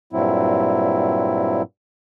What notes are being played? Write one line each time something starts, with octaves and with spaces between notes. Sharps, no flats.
G2 A#2 F#3 C4 E4